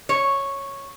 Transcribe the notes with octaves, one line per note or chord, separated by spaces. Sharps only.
C#5